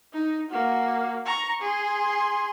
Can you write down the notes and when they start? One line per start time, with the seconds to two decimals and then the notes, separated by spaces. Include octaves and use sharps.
0.13 D#4
0.51 A#3 F#4
1.26 A#5 C#6
1.61 G#4 C6